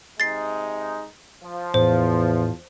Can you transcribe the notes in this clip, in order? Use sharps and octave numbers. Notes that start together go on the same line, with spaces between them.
C3 G#3 D#4 A6 C7
F3
E2 A2 C5